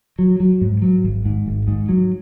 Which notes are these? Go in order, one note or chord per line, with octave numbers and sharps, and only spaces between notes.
F#3
F#3
G#2
F#3
G#1
G#2
G#1
G#2
F#3